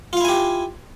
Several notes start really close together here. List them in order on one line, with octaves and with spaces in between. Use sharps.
F4 F5 E4 G#5 G4